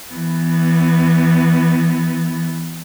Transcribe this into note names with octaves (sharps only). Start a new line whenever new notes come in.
E3 B3